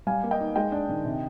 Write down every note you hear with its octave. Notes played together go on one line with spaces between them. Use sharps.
G3 F5 G#5
A#3
D#5 G5
D#4
G#3 D#5 G5
D4
D#3
C3